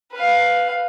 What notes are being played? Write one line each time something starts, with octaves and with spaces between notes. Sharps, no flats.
B4 F5